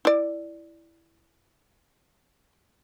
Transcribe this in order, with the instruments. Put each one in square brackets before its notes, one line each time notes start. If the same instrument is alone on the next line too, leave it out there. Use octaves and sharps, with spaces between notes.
[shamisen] E4 D5